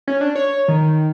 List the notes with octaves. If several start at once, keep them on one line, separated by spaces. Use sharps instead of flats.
C#4
D4
C#5
D#3